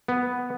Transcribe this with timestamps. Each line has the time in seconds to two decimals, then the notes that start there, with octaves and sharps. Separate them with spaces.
0.08 B3